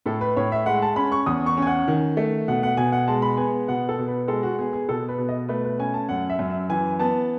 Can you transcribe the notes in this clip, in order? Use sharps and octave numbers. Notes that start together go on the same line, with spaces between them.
A2 A4
B4
A2 C#5
E5
G#3 F#5
A5
C#4 B5
C#6
E2 D#6
C#6
C#4
G#5
F#5
D#3
A3
B2 F#5
F#5
B2 G#5
F#5
G#3 A5
B5
B3 G#5
B2 F#5
A4
B2
B4
G#3 A4
F#4
B3 G#4
G#4
B2 A4
B4
B2
D#5
A3 B4
B4
C#4 G#5
A5
F#2 F#5
E5
F#2
E5
E3 G#5
B3 A5